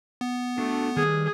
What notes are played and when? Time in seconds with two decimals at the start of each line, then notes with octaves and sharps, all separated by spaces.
0.21 B3
0.58 A3 D4 F#4 A4
0.96 D#3 G3 G#4 B4